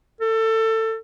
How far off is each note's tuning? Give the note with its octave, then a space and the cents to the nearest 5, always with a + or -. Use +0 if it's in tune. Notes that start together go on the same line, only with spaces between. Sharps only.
A4 +25